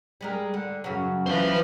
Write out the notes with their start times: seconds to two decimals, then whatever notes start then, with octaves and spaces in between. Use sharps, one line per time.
0.21 G3 G#3 A#4
0.54 D3
0.84 F#2 C#3 F#3
1.26 E3 B4 C5 F5